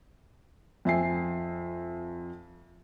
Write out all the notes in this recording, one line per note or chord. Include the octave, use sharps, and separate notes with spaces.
F2 E5 G#5 C7